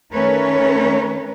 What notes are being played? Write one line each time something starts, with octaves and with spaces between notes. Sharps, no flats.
D#3 A3 C#4 A#4 B4 C#5